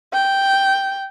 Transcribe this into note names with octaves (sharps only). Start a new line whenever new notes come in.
G5